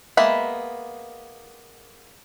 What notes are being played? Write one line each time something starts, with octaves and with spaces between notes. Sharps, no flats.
G#3 A#3 B3 E5 B5